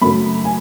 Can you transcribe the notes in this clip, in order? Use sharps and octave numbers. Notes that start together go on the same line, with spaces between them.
F#2 C#3 F#3 A3 B5
G#5